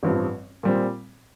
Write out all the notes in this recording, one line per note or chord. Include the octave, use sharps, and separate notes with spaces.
A1 G2 F3 C4
A#2 G3 C4